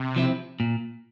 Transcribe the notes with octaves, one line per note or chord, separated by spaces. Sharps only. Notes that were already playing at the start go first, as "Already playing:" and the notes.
Already playing: C3
F3 C4 E4
A#2